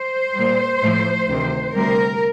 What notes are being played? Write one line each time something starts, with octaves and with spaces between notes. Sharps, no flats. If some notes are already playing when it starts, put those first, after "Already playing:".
Already playing: C5
A#2 G3
A2 F3 A3
D2 C3 D#3
D2 C3 G3 A#4